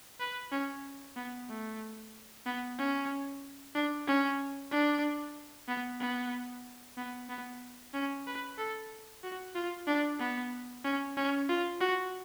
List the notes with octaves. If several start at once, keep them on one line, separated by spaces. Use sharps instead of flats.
B4
C#4
B3
A3
B3
C#4
D4
C#4
D4
B3
B3
B3
B3
C#4
B4
A4
F#4
F4
D4
B3
C#4
C#4
F4
F#4